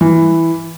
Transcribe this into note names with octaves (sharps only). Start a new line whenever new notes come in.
E3